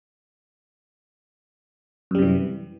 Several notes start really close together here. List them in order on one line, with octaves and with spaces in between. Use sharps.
F#2 G3 C3 E3